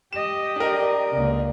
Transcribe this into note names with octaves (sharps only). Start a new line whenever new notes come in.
G4 D#5 E7
D4 A#4 D5
C#2 A#3